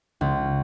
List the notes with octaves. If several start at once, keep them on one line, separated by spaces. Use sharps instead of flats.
C#2